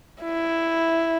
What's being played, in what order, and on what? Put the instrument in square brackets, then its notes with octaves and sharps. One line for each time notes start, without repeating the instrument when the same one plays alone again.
[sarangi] E4